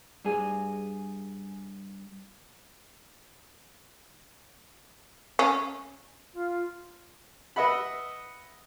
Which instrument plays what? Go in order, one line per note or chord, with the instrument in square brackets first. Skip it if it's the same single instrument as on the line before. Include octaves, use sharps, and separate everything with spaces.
[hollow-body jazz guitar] G2 G#4
[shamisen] C#4
[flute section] F4
[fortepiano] B4 D#5 E5 F#5 B5